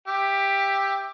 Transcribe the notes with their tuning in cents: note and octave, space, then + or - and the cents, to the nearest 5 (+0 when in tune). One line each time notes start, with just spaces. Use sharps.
G4 +10 E5 +0